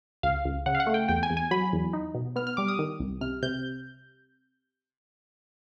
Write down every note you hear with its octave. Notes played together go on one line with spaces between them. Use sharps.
C#2 F5
C#2
C#3 F#5
F5
F#5
A3
G5
E2 G5
G#5
E2
G#5
F#3 B5
E2
D#4
B2
B3 F6
F6
G3 D6
D#6
D#3
C2
C3 F6
C3 G6